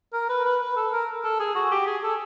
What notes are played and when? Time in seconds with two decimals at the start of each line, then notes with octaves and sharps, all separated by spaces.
0.13 A#4
0.29 B4
0.44 B4
0.61 B4
0.76 A4
0.92 A#4
1.24 A4
1.40 G#4
1.55 F#4
1.71 G4
1.87 G#4
2.03 A4